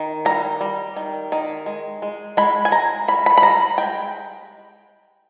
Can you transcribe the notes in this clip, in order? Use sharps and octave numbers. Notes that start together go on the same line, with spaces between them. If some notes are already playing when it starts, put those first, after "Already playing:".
Already playing: D#3
G3 A#5
G3
D#3
D#3
G#3
G#3
G#3 B5
G#5
G#3 A#5
G3 B5
B5
B5
G3 A#5
G#3 G5